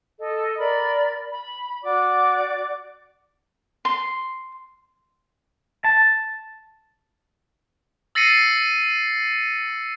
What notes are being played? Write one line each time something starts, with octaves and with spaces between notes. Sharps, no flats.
A4 D#5
A#4 D5 B5
B5
F#4 D5 D6
C6
A5
E6 A6 A#6 C7 C#7 D#7